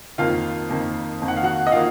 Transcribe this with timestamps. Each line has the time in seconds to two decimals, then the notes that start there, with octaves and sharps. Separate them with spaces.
0.18 F2 D#3 A#3 F4 F5
0.69 F2 D#3 A#3
1.22 F2 D#3 A#3
1.28 F#5
1.37 F5
1.43 F#4 F#5
1.67 D#5
1.72 D#3 A#3 F4 F5